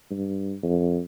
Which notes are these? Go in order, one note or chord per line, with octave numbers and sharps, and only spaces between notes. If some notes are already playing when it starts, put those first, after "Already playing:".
G2
F2